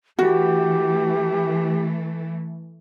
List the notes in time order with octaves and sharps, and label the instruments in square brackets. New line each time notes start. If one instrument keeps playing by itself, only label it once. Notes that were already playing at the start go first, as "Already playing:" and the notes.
[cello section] E3 A3 [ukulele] F#4 [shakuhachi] G4